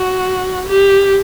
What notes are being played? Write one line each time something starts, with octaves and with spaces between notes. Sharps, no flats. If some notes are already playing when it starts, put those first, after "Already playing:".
Already playing: F#4
G4